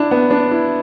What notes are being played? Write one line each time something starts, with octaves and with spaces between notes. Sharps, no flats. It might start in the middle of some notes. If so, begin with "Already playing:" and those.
Already playing: D4 E4
B3
D4
E4